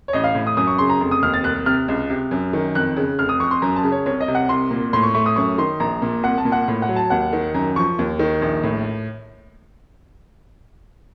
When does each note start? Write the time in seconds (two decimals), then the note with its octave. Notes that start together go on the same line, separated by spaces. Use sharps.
0.08 C#5
0.13 A1 D#5
0.24 F5
0.35 A2
0.47 D#6
0.57 F#2 D#6
0.67 C#6
0.78 C#3 C6
0.90 A#5
1.00 F1
1.11 D#6
1.23 D#2 F6
1.34 A6
1.44 C2 F#6
1.66 C3 F6
1.88 C#2
2.10 C3
2.31 F#2
2.53 D#3
2.75 F2 F#6
2.97 C#3
3.19 F1 F6
3.29 D#6
3.40 F2 C#6
3.51 C6
3.62 F#2 A#5
3.76 A5
3.83 C#3
3.92 C#5
4.06 C2 C#5
4.21 D#5
4.28 C3
4.35 F#5
4.49 C2 C6
4.71 A#2
4.93 A2 C6
5.03 C#6
5.15 A3 C#6
5.26 D#6
5.36 F#2 C#6
5.58 D#3 C6
5.80 A#1 A#5
6.02 A#2
6.23 C2 F#5
6.38 A5
6.45 A#2
6.52 F#5
6.68 A2
6.82 F#5
6.89 F#3
6.96 A5
7.10 D#2 F#5
7.33 D#3
7.54 F#2 A#5
7.76 F3 C#6
7.99 D#2
8.19 D#3
8.42 A#1
8.63 A2